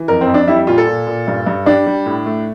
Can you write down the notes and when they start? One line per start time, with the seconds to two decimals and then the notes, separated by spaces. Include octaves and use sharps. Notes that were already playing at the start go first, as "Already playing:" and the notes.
Already playing: E3
0.08 F2 A#4
0.21 C4
0.28 F2
0.34 D4
0.47 G3 E4
0.67 A#2 F4
0.78 A4
0.87 A#2
1.07 A#2
1.27 G2
1.46 G2
1.66 G3 D4
1.86 G3
2.06 A2
2.26 A3